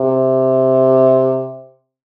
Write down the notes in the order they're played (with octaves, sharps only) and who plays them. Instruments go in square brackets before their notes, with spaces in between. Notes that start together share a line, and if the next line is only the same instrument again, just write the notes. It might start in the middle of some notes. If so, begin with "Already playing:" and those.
Already playing: [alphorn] C3